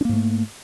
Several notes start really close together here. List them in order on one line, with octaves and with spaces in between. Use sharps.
D4 A#3 G#2 A3